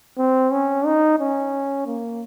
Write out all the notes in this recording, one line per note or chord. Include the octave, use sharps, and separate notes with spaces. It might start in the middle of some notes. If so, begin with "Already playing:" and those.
C4
C#4
D#4
C#4
A#3